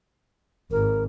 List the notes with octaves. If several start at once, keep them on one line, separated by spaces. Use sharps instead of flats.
G#1 A#4